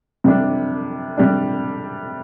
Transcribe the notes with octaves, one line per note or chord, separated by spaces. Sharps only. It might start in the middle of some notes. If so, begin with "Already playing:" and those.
C3 G3 D4
C3 G3 D4